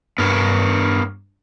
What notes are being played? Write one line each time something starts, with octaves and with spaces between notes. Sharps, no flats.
G2 B3 A#4 C#5